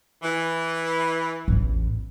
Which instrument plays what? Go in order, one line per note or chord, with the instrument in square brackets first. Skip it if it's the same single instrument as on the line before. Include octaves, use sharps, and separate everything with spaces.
[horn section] E3
[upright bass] A1 E2